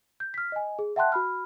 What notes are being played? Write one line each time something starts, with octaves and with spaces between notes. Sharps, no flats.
G6
F6 B6
D#5 G#5
G#4
E5 F#5 G5 A5 C6 F#6
F#4 B5 F6